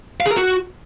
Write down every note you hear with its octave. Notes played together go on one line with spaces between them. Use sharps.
F5
G#4
A#4
F#4